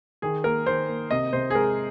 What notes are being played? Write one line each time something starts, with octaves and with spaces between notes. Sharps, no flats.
D#3 G#4
A#3 A#4
D#3 C5
A#3
C3 D#5
C3 C5
G#4
G#3 A#4